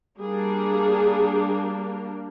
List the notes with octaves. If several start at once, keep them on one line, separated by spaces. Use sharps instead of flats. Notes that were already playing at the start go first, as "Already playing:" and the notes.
G3 A#3 D4 G#4